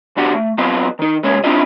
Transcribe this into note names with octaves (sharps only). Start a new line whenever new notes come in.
B1 E2 D4 F#4 G4
A3
F#3 B3 C4 F4 B4 D#5
D#3 D#4
C3 G#3 A#3 C#4 C#5
C4 D4 E4 F4 D#5